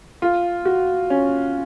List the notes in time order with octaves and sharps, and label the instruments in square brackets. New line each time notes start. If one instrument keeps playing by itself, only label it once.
[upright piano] F4
F#4
C#4